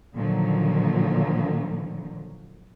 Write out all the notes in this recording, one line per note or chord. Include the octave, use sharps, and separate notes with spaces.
A#2 D3 D#3 F3 F#3